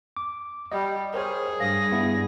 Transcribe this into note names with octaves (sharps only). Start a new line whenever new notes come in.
D6
G3 D#5
G#4 A#4 C5 C#5
G2 F5 D#6 A#6
B3 E4